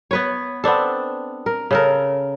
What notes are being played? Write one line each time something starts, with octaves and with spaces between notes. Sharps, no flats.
B3 B4 C#5
B3 C4 D4 A4
A#4
C#3 A4 A#4